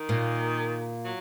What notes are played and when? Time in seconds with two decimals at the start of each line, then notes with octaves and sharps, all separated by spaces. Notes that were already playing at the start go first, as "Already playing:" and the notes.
Already playing: D#3
0.09 A#2
1.05 F#3